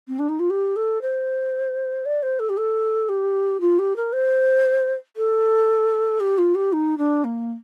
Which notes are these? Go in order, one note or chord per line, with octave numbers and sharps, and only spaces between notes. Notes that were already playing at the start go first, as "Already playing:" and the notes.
C4
D4
D#4
F4
G4
A4
C5
D5
C5
A4
G4
A4
G4
F4
G4
A#4
C5
A4
G4
F4
G4
D#4
D4
A#3